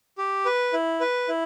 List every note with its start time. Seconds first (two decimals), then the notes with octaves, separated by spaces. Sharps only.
0.18 G4
0.45 B4
0.73 E4
1.00 B4
1.28 E4